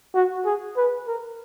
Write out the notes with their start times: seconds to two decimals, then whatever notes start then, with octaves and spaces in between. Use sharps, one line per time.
0.15 F#4
0.46 G#4
0.77 B4
1.08 A#4